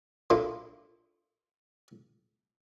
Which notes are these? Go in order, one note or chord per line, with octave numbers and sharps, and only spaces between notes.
A#3 D4 E4 F4 A4